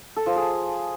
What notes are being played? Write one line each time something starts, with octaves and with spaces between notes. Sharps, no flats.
A4
F3
G#4